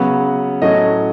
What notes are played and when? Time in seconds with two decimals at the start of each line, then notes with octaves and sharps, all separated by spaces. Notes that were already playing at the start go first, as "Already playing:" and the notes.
Already playing: C#3 F#3 B3
0.62 A2 F#3 A3 C#4 D#5